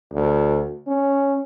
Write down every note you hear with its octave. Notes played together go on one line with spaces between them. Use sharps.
D2
C#4